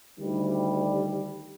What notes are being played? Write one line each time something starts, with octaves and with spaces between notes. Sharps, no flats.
D2 D#3 G3